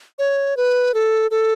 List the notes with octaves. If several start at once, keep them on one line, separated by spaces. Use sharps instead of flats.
C#5
B4
A4
A4